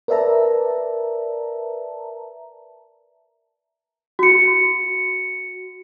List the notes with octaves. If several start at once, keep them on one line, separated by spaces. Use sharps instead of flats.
A#4 B4 D5 E5 A5 A#5
F#4 C#7